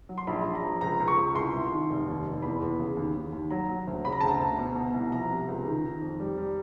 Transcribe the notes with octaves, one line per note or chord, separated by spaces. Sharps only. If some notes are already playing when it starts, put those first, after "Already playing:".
F#3
C6
A#1 B5
A#1
A#5
F3
C#2 A#5
C#2
C#6
C#2
C2 C6
C2
D#3
F1
D#2
F1
E2 B5
E2
C#3
D#2
D#2
D#2
F#3 A#5
F#3
D2
C#3 B5
A#5
D2 A5
A#5
D2
B2
B2
C2
F3 A#5
C3
C#2
D#3
D#3
F2
G3
G3